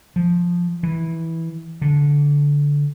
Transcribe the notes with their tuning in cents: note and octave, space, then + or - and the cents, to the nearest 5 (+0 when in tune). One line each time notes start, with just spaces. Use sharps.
F3 +5
E3 -10
D3 -15